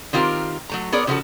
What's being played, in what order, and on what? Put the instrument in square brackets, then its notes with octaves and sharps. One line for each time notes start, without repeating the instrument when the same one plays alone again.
[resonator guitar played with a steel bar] D#3 C4 F4 G4 A#4
F#3 A3 A#5
B3 G#4 A#4 C#5 D5
C#3 F3 B3 E4 F#4 A4